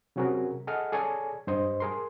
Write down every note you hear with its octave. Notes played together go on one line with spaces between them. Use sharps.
C3 F#3 C#4 F#4 G#4 A#4
G#4 A4 D#5 F#5 F6
G#4 A4 C#5 D5 G#5
G2 C5 D#5
G#4 A#4 C6